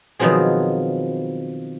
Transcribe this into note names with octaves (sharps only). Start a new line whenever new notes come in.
B2 D#3 F3 F#3 C4 G#4